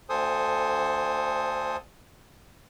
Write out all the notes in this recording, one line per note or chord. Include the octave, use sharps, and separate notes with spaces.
D2 D3 A4 C5 G#5 D#6